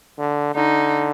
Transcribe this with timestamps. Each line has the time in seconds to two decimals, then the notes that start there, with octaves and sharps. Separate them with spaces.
0.19 D3
0.55 D3 D#4